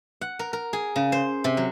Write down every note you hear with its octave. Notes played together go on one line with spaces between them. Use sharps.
F#5
A#4
A#4
G#4
C#3
C5
C3
F#3